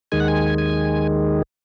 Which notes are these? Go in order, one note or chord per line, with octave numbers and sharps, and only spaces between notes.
D#2 D#3 G#3 G#5
F#5
G#5
G#5